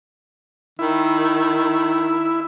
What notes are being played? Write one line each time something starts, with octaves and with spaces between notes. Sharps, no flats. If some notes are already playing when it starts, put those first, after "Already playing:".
D#3 E4